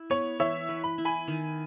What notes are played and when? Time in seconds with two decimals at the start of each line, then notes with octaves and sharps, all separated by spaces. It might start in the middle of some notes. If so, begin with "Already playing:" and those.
Already playing: E4
0.10 B3 C#5
0.39 E3 C#5 E5
0.69 B4
0.84 B5
0.98 E4
1.05 G#5 B5
1.28 D#3